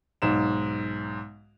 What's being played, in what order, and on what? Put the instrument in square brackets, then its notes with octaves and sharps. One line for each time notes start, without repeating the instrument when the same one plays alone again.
[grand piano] B1 G#2 E7